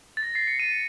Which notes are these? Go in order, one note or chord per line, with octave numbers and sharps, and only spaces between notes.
A6
A#6
C7
C#7
D#7